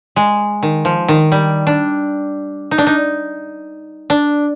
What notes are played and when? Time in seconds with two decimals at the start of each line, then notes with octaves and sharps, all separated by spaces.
0.16 G#3
0.63 D#3
0.85 F3
1.08 D#3
1.32 G3
1.67 D4
2.71 D#4
2.78 D4
2.87 D#4
4.10 D4